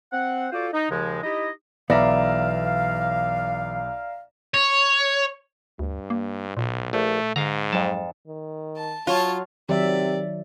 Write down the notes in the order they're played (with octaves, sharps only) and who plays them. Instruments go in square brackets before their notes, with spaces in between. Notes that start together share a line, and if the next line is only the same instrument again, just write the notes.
[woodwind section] C4 F#5
F4 F#4 A4 C5 D5
D#4
D#2 C#3 F3 G#3
D#4 E4 G4 D#5
[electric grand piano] B1 A#6 [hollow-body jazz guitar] E3 B3 [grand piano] D5 E5 A#5 [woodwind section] F5
[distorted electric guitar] C#5
[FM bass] D2 [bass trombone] G2
[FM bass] A#3
[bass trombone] B1 [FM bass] A#2
[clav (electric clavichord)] A#1 [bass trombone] A3
[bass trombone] G#2 [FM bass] D3 [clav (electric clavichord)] F5 A#5
[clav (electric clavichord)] F2 A5 [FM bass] F#3
[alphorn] D#3
[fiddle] A5
[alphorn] F#3 [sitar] F4 [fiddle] C#5 A5
[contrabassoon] C3 [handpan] D#3 F#3 E5 [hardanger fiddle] D5